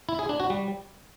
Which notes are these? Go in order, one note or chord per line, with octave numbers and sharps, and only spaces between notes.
E4
G#4
D4
F#4
G3